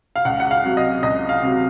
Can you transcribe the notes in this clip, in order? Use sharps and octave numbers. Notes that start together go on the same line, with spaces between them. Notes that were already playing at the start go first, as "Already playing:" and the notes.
F5
C#2 F#5
F#5
F5
C3 F#3
D#5
C#2 D#5
F5
C3 F#3